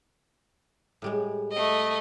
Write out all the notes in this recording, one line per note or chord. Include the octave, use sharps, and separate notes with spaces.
A2 G3 G#3
A3 D#5